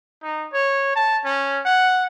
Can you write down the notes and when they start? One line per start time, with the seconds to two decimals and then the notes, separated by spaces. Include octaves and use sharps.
0.23 D#4
0.53 C#5
0.96 A5
1.25 C#4
1.65 F#5